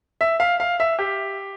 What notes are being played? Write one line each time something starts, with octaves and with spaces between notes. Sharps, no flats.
E5
F5
F5
E5
G4